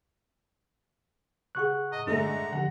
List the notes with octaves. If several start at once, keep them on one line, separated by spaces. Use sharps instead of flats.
C#3 G4 G#4 F#5 C#6 F#6
A2 D#5
G2 D3 G#3 A3 A#5
D3 F3 G4 F#5